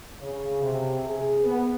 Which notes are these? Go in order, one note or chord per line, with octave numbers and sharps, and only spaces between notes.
C#3
C3
G#4
B3